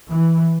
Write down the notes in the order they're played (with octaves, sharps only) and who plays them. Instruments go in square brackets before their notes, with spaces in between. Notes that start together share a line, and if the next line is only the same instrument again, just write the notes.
[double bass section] E3